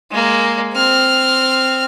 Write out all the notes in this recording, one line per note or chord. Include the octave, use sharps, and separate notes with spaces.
G#3 A#3
C4 F6